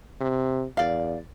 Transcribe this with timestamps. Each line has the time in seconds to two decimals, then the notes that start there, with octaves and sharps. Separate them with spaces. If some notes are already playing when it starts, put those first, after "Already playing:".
0.20 C3
0.77 E2 D5 F5